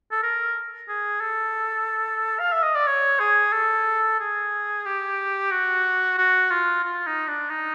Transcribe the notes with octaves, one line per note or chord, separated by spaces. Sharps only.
A4
A#4
G#4
A4
F5
E5
D#5
D5
C#5
G#4
A4
G#4
G4
F#4
F#4
F4
F4
D#4
D4
D#4